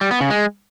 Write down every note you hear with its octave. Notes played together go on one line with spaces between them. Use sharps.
G3
B3
C#3
G#3